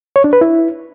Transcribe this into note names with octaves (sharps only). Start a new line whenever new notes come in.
C#5
D4
B4
E4